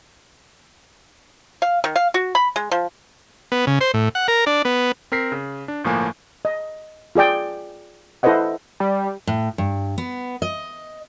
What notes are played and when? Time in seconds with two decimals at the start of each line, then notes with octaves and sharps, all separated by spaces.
1.62 F5
1.84 D#3
1.96 F5
2.14 F#4
2.35 B5
2.56 G#3
2.71 F3
3.52 B3
3.67 C#3
3.81 C5
3.94 A2
4.15 F#5
4.28 A#4
4.46 D4
4.65 B3
5.12 C4 A#4 B6 C7
5.32 C#3
5.68 D4
5.84 G1 A2 F3 A#3 G#5
6.45 D#5
7.15 F4 G#4 D5 G5
8.23 E4 A4 B4 C5 D#5 F#5
8.80 G3
9.27 A2
9.58 G2
9.98 B3
10.42 D#5